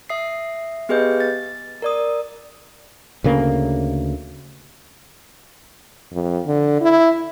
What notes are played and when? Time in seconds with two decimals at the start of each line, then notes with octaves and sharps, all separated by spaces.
0.09 E5 D#6 C7
0.89 B3 G4 G#4 B4 D#5 G6
1.20 A6
1.82 A#4 D5 D#6
3.24 D2 C#3 A#3
6.13 F2
6.46 D3
6.81 E4